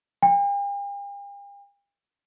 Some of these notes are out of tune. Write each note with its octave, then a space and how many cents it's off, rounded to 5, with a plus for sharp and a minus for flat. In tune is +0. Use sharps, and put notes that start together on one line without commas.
G5 +45